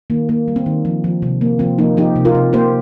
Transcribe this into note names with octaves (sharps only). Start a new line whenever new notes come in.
D#3 A#3
A#3
G3
C4
D#3
F3
F3
C3
A#3
F3 C4
F3 A#3 D#4
F3 D#4 G4
C3
F4 A#4
C3
A#3 G4 C5